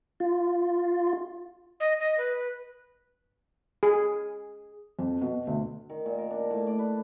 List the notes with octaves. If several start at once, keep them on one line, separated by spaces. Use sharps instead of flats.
F4
D#5
D#5
B4
G#4
F2
B2
D2
D#3
A#2
A#4
D4
A2
D5
B4